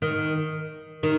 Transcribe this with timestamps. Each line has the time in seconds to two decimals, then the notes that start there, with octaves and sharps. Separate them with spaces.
0.02 D#3
1.03 D#3